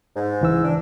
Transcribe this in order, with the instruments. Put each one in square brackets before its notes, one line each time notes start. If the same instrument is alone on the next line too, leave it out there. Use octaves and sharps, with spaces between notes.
[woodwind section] G#2
[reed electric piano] C#2 E3 E6
[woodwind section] D4